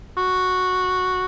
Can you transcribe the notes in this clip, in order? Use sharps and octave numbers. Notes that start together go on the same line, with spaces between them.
F#4